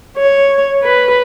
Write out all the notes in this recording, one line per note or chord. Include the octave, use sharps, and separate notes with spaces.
C#5
B4